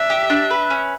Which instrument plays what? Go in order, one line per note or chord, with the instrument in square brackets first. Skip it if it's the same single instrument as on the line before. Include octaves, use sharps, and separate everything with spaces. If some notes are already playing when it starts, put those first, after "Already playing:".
Already playing: [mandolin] D4 [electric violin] E5
[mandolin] G4
D4
B4
C#4